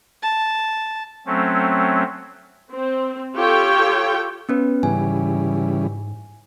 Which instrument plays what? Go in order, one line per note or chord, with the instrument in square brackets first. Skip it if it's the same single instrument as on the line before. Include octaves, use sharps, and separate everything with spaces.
[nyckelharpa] A5
[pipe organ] F#3 A3 C4 C#4
[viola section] C4
F4 G4 A4 C#5 G5
[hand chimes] B3 C#4 B4
[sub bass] G#2 [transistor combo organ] C#3 E3 G3 [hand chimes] G#5